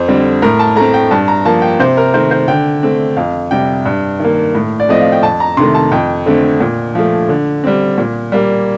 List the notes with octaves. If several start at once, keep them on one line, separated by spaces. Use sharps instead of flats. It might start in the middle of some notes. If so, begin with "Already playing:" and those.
Already playing: F2 C5
D3 G3 C4
A2 A#4
A5
A3 C4 A#5
G5
G2 A5
A#5
F3 A#3 A5
G5
C3 C5
A#4
D#3 A3 C4 C5
C5
D3 G5
A3 C4
F2 F5
C3 G3 G5
G2
D#3 A#3
A2
D5
F3 A3 C4 D#5
F5
G5
F2 A5
A#5
C3 D#3 A3 C6
A5
F2 G5
D3 A3 C4
A#2
F3 A3
D3
G3 C4
A#2
G3 A#3